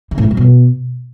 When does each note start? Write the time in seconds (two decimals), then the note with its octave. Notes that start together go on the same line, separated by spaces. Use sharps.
0.11 C#3
0.18 A2
0.24 F#2
0.31 G3
0.37 B2